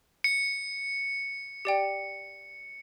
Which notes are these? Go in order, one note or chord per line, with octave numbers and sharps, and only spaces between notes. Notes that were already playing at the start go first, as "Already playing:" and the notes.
C#7
G4 D5 G5